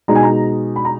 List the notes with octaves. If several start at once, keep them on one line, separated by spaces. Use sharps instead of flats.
B2 G#3 D#4 A#5
G#5
A#5
B5
A#5